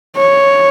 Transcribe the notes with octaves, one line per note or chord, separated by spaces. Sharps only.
C#5